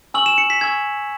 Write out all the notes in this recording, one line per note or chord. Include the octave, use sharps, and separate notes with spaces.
G#5 C#6 E6 F#7
E7
C#7
B6
G#5 C#6 E6 G#6